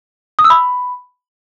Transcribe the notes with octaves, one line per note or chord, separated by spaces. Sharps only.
D#6
E6
B5